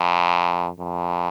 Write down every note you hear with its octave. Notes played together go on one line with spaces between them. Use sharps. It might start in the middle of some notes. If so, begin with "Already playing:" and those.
Already playing: F2
F2